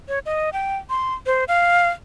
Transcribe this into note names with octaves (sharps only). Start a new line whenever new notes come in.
C#5
D#5
G5
C6
C5
F5